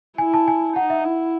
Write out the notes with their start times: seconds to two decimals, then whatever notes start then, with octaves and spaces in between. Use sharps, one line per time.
0.18 E4 G#5
0.34 A5
0.48 G#5
0.76 D#4 F#5
0.90 E5
1.04 E4